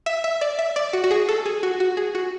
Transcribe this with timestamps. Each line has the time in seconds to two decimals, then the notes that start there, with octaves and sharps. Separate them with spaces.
0.06 E5
0.24 E5
0.41 D5
0.59 E5
0.76 D5
0.93 F#4
1.04 F#4
1.11 G#4
1.29 A4
1.46 G#4
1.63 F#4
1.80 F#4
1.97 G#4
2.15 F#4